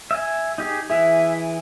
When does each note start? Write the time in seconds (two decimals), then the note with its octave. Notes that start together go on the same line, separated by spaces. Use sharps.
0.11 E5 G#5
0.58 D#4 G4 G#4
0.90 E3 E4 G#4 E5